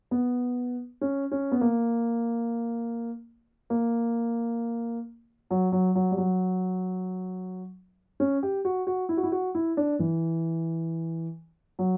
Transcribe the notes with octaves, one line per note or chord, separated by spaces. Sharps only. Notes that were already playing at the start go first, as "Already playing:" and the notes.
B3
C#4
C#4
B3
A#3
A#3
F#3
F#3
F#3
G3
F#3
C#4
G4
F#4
F#4
E4
F#4
E4
F#4
E4
D4
E3
F#3